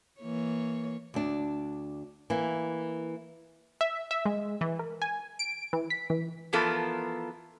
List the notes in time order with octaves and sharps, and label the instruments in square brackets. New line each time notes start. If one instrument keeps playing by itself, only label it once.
[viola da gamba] E3 A#3 C#5
[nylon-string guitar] D2 D4
E3 A#3
[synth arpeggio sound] E5
E5
G#3
E3
A#4
G#5
D7
E3
B6
E3
[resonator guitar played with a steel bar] E3 F3 B3 F4 A4 A#4